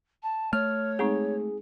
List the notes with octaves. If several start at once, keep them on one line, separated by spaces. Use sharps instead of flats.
A5
A3 C#5 F6
G#3 C4 D#4 G#4